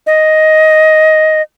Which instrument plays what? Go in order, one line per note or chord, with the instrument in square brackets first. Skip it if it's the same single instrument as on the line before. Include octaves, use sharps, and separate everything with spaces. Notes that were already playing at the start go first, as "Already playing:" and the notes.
[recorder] D#5